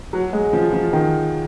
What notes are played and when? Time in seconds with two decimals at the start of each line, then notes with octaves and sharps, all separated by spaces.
0.13 F#3
0.33 G#3
0.53 F3
0.73 F3
0.93 D#3